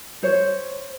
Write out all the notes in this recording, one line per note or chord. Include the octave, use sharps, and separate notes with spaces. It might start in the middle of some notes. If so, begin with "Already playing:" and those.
C5 C#5